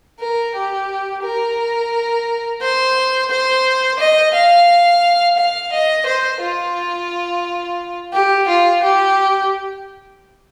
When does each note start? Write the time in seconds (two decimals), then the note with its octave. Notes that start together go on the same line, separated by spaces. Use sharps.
0.20 A#4
0.54 G4
1.23 A#4
2.61 C5
3.30 C5
3.99 D#5
4.34 F5
5.37 F5
5.72 D#5
6.06 C5
6.41 F4
8.13 G4
8.48 F4
8.82 G4